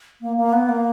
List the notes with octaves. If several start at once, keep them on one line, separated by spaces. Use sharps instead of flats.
A#3
A#3
B3
A#3